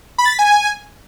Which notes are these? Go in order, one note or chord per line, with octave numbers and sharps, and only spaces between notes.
B5
A6
B6
G#5